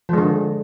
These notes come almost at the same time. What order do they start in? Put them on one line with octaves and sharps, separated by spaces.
F3 G#3 D3